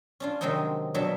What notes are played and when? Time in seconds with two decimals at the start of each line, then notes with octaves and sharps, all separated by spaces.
0.20 C#4 D4 F4
0.41 C3 D#3 F#3 G#3 C4 D#4
0.94 B2 F#3 D4 E5